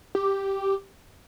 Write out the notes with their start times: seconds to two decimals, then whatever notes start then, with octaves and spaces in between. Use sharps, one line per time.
0.15 G4